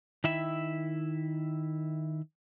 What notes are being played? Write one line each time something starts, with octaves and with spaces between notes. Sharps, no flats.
D#3 E4 E5